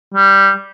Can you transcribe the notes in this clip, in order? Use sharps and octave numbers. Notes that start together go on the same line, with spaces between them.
G3